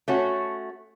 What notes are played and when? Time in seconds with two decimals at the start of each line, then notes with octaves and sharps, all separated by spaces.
0.08 A3 C#4 F#4